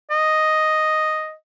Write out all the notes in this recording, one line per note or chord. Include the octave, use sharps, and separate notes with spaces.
D#5